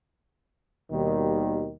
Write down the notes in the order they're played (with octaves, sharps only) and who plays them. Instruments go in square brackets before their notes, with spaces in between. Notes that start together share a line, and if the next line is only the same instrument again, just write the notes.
[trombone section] D#2 B2 D#3 G3